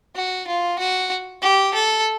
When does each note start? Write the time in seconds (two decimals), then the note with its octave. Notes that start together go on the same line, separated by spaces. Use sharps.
0.16 F#4
0.47 F4
0.79 F#4
1.42 G4
1.74 A4